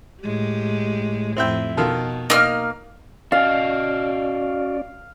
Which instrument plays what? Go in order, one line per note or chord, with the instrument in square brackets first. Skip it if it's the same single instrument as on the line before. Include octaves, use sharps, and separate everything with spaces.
[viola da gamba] A2 G#3 G4
[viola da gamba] F2 A2 [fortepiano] C4 E4 G5
[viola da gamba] B2 [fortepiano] D#3 F4 A4
[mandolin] A#3 F6 [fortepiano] D#4 D#5
[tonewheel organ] C#4 D5 [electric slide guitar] F#4 D#5 [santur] F5